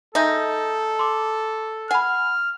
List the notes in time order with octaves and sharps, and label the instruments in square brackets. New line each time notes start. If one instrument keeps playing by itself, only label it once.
[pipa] G#3 D#4 [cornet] A4 [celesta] E5 G6 A#6
[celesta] C6 D6
[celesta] F#5 B5 [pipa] G#5 [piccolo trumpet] F6